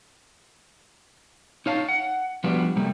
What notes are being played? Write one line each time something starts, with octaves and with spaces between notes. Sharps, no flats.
D#4 C#5 F5 A5
F#5
F3 G3 B3 D4 F#4 B4
C3 G3 A3 A#3